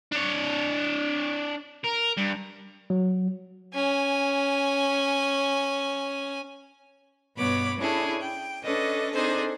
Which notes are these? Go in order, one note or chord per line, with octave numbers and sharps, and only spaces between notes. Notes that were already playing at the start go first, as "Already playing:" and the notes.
D4 C#5
A#4
G2
F#3
C#4 G#5
G2 B2 B3 C#5 B5 D6
C#4 D4 E4 G#4 A4
G5
C#4 D4 A4 B4 D#5
C4 D4 D#4 G#4 A4 C5